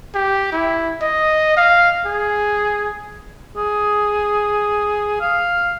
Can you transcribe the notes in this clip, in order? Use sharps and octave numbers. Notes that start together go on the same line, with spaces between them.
G4
E4
D#5
F5
G#4
G#4
F5